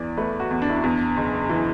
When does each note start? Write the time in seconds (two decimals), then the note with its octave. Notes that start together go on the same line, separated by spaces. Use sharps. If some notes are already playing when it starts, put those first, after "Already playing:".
Already playing: E2 E3 D5
0.17 A3 B4
0.40 F#4
0.51 E2
0.62 D4
0.70 E4
0.77 D4
0.84 E2
1.17 F#1
1.49 E3